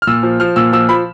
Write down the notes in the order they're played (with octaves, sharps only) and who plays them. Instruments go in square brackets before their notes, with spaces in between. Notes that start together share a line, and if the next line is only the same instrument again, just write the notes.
[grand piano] F6
A#2 E6
F3
F3 F6
A#2 E6
F3 E6
F3 B5